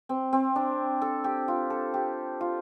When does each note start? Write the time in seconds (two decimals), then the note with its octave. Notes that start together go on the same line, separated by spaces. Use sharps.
0.09 C4
0.33 C4
0.56 D4
1.02 A4
1.24 G4
1.48 F4
1.70 A4
1.94 G4
2.41 F4